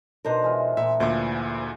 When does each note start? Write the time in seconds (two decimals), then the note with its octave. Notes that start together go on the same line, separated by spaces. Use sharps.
0.25 B2 D4 D#4 A#4 C5
0.42 E3 G#3 F4
0.77 A#2 E4 E5
1.00 D2 A#2 E3 C5